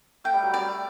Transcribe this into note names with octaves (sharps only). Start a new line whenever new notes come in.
A3 G5
G3
F#3
G3 D5